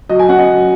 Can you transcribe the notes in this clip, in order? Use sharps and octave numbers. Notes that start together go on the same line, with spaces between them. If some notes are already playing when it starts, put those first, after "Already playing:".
F#3 D#5
G#5
C#4 F#5
D#5
F#3